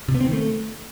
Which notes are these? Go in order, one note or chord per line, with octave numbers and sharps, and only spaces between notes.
C3
B3
C4
D#3
A3